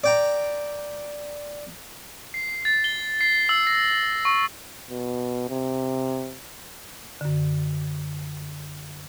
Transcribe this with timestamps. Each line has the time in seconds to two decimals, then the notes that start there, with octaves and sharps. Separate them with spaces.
0.04 D5 G5 A#5
2.34 C7
2.65 A6
2.84 G7
3.21 C7
3.49 E6
3.67 A#6
4.25 C#6
4.90 B2
5.49 C3
7.21 F#2 D3